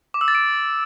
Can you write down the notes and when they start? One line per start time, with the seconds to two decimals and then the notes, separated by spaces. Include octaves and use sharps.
0.14 D6
0.21 E6
0.28 A6
0.35 D7